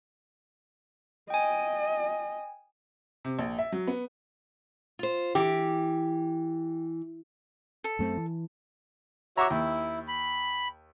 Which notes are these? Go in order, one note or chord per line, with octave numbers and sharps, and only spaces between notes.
D#5 G5 G#5
C3
A#1
E5
F#3
B3
F4 C5
E3 G4
A4
F#2 A3 C4
E3
F#4 C#5 E5 A#5 D6
D#2 E4
B5